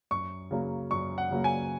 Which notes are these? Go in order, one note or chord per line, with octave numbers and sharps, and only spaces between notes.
F#2 C#6
C#3 F#3 A#3
F#2 C#6
F#5
C#3 F#3 A#3
G#5